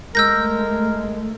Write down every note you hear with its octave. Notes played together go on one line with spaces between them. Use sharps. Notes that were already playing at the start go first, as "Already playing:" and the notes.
G#3 A3 A#4 E6 G6 A#6